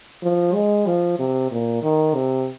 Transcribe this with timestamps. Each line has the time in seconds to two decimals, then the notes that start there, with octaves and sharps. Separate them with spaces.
0.23 F3
0.54 G#3
0.87 F3
1.19 C3
1.51 A#2
1.82 D#3
2.15 C3